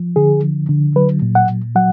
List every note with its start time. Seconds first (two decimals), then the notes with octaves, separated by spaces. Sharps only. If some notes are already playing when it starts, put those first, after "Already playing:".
Already playing: F3
0.16 D3 G#4
0.43 F3
0.69 D3
0.96 F#3 B4
1.22 A#2
1.35 F#5
1.48 A#2
1.75 F#3 F#5